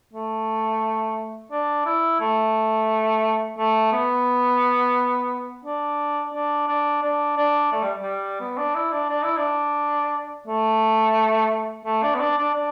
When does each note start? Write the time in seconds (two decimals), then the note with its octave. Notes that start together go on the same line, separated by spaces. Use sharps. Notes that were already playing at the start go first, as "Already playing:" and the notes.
0.13 A3
1.51 D4
1.86 E4
2.20 A3
3.58 A3
3.92 B3
5.65 D4
6.34 D4
6.68 D4
7.02 D4
7.37 D4
7.72 A3
7.82 G3
8.02 G3
8.40 B3
8.58 D4
8.75 E4
8.92 D4
9.09 D4
9.23 E4
9.37 D4
10.47 A3
11.85 A3
12.03 D4
12.15 B3
12.20 D4
12.37 D4
12.54 D4